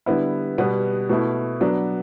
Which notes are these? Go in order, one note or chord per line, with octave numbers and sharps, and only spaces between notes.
D3 G3 B3 E4
B2 G3 B3
B2 A3 E4
F#3 B3 D4